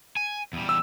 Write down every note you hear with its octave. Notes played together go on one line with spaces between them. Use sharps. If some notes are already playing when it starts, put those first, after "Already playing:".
G#5
E2 G3
E6